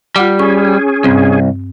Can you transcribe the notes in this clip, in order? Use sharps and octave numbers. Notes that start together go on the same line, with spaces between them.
G3 F4 F#5 D6
C#4 G#4 C#6
C2 G2 C4